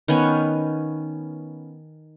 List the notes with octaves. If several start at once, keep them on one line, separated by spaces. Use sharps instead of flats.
D#3 B3 C#4 G#5